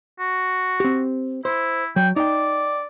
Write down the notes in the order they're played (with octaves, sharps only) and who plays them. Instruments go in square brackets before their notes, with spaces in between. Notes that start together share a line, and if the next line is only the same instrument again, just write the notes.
[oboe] F#4
[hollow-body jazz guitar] C4 G4
[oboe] E4 [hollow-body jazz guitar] C5
[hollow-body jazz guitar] F#3 [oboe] G5
[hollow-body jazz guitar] D#4 G5 [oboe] D5